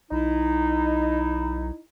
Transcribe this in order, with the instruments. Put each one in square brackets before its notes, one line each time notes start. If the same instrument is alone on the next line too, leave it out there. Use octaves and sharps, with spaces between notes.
[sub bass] B1 [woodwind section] D#4 E4